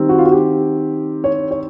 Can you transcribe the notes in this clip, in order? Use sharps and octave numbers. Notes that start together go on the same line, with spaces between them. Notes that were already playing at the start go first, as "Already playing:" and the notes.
Already playing: D#3 G3 C4
F#4
F4
F#4
G4
C#5
C#5